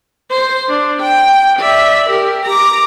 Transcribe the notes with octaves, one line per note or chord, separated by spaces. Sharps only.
C5
D4
G5
D5 E5
G4 A#4
A#5 D6